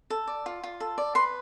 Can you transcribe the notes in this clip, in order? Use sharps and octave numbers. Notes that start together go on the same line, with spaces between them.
A4
D5
F4
F4
A4
D5
B4 C6